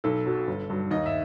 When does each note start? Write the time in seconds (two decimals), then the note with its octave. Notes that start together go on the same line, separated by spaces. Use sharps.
0.04 B1 A4
0.26 B2 F#3
0.47 G1
0.70 G2 F#3
0.91 D#2 D#5
1.06 E5